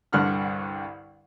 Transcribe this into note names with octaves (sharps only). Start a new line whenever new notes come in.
C2 G2 D3 F#5 F6 F#6